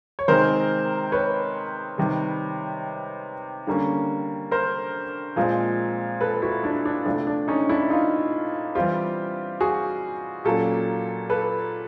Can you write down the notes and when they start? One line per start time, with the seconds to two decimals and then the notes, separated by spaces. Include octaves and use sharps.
0.19 C#5
0.28 C3 D#3 G#3 C4 A#4 C5
1.12 B4 C#5
1.98 C3 D#3 G3
3.67 D3 G3 A#3 C#4
4.51 A#4 C5
5.36 A#2 F3 G#3 C4
6.21 A4 B4
6.42 E4 F#4
6.64 D4 E4
6.85 D4
7.06 C3 F3 A3 D4
7.27 D4
7.48 C#4 D#4
7.69 D4 E4
7.90 D#4 F4
8.75 E3 G3 C4 F4 G4
9.61 F#4 G#4
10.45 A#2 F#3 A#3 C#4 G4 A4
11.30 A4 B4